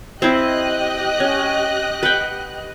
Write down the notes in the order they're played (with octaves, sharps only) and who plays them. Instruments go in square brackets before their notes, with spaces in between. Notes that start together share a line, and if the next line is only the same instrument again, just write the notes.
[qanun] C4 E4 [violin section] G4 D#5 F#6
[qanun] C#4
B4 F#5 G5